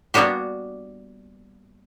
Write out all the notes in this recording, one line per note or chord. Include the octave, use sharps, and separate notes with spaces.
G3 A#3 B3 D4 F#4 G4